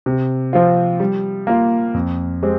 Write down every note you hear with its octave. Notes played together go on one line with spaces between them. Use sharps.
C3
F3 C4 F4
G3
A#3 F4
F2
G#3 C4 G4